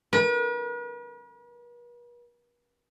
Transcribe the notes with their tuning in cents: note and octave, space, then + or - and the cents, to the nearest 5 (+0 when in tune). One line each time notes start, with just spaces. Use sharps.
B4 -45